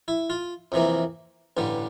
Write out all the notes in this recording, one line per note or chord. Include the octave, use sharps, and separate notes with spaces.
E4
F4
F2 C3 E3 A#3
A1 G2 D3 G3